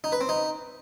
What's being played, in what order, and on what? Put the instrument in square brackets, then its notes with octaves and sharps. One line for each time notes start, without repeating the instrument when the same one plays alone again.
[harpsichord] D#4
B4
C4
D#4